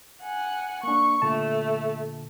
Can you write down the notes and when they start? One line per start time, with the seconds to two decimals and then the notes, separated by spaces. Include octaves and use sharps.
0.23 F#5 G#5
0.83 A#3 D4 C#6
1.22 A#2 D3 A3 A5